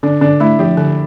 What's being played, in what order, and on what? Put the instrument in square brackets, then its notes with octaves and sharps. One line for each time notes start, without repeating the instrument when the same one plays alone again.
[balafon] D3 [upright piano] D4
[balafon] D3 [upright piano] D4
[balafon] A3 [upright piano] E4
[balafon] F3 [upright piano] G4
[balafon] D3